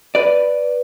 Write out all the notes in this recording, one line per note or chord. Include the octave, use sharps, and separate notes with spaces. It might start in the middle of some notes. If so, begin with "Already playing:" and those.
B4 D5